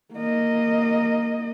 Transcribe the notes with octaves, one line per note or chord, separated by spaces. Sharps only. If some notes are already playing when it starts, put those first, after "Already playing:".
A#3 D#5